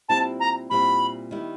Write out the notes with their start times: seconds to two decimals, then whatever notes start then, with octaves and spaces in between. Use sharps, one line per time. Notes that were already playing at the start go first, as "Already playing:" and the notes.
0.09 A#2 G3 C4 E4 A5
0.40 A#5
0.70 A#2 G3 C4 E4 B5
1.31 D#3 G3 B3 E4